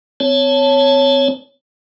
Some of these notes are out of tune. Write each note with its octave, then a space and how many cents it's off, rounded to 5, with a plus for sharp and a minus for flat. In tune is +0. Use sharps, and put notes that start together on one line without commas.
C4 -35 C#5 +0 A5 +0